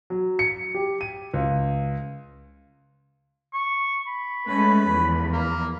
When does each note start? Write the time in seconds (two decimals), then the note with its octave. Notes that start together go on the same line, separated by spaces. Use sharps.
0.10 F#3
0.39 C#7
0.75 G4
1.01 D#7
1.34 C#2
3.53 C#6
4.07 B5
4.47 G#3 A3 C#4 B4
4.90 E2 F3
5.33 A#3